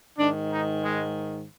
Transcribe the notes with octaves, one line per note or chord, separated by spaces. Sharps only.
G#2 D#3 D4
D#4
G#3